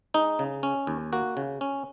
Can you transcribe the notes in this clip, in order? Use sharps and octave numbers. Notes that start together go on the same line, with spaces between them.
G#3 D#4
C#3
C#4
D#2
A#3 F#4
C#3
C#4